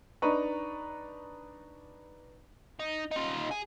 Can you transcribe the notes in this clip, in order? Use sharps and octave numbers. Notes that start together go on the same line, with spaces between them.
D4 D#4 B4 A#5 C#6
D#4
D#4 F4
G#4